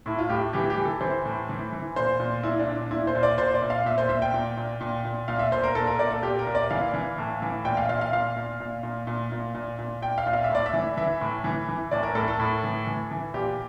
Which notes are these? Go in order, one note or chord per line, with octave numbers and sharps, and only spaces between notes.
A2 E4
F4
A2 G4
E3 G4
G4
E3
A4
E3 C5
A2
E3
E3
A#2 C5
A#2
A#2 E4
D4
A#2
D4
A#2 E4
C5
A#2
D5
A#2 C5
D5
A#2
F5
A#2 E5
C5
A#2 E5
G5
A#2
A#2
A#2
A#2
A#2 F5
E5
A#2 C5
A#4
A#2 A4
A#4
A#2 D5
A4
A#2 G4
A#4
A#2
D5
E3 F5
E3
A2
E3
A#2 G5
F5
A#2 F5
F5
A#2 F5
A#2
A#2
A#2
A#2
A#2
A#2
A#2
A#2 G5
F5
A#2
F5
E5
A2
D5
E5
E3
E3 E5
A2
E3
E3
A2 D5
A#4
A2 A4
A4
A2
E3
E3
E3
A#2 G4